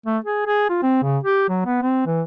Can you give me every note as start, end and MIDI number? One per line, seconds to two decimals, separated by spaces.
0.06 0.18 57
0.25 0.42 68
0.46 0.70 68
0.70 0.81 65
0.82 1.02 60
1.03 1.18 49
1.24 1.46 67
1.49 1.64 54
1.66 1.80 59
1.83 2.06 60
2.07 2.22 52